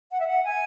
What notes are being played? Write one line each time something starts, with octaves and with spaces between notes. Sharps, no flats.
F#5
E5
F#5
G#5